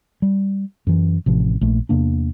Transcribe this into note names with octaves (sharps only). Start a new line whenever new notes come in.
G3
F#2 E3
A1 C3 F3
A#1 A3
E2 C3 A#3 D4